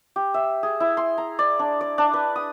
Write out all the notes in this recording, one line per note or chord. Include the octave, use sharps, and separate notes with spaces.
G4
E5
G#4
E4
C6
A#5
D5
D4
D5
D4
B4
D#6